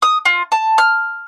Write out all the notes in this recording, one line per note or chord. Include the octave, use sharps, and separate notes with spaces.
D#6
F4
A5
F6